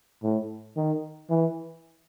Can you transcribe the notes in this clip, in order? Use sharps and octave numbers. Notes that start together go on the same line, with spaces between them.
A2
D#3
E3